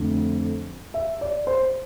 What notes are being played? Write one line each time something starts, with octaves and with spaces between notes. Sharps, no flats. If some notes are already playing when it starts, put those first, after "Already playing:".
Already playing: F2 D3 A3 D4
E5
D5
C5